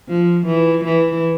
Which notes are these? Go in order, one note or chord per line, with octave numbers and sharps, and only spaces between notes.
F3
E3
E3